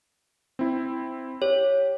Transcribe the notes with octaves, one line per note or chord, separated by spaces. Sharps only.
C4 E4
G4 C#5